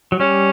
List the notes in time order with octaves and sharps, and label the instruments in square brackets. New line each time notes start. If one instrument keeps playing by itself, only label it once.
[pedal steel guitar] F#3
[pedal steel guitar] G3 [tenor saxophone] C#4